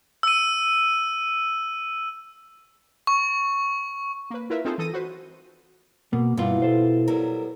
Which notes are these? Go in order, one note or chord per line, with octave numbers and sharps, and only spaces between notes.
E6 D#7
C#6
A#3 B4
E4 F4 A#4 B4 E5
C4 D#4 F4 G#4 A4 C5
E3 A4 D#6 A#6 D#7
F#4 B4 C5
B2 A#3
G2 B2 E3 F4
A4 C5
F#3 G3 B3 A4 A#4